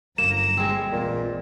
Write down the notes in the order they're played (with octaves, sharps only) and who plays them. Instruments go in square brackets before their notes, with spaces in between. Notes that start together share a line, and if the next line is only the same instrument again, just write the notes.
[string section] G1 F#2 A#5 [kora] A#3 [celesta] E7
[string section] G3 [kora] G#3 C4
[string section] A#1 E2 [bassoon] A#2